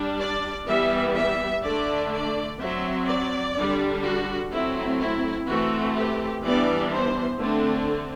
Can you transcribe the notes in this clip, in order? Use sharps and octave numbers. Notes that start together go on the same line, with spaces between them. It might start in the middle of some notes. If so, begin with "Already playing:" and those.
Already playing: G3 D4
D5
E3 G3 B3 E5
E5
D3 A3 D4 D5
D5
F#3 C4 E5
D5
D3 G3 D4
F#4
F#3 A3 C4 E4
E4
E3 A3 C4 F#4
G4
E3 G3 B3 D4 D5
C5
D3 A3 C4 D4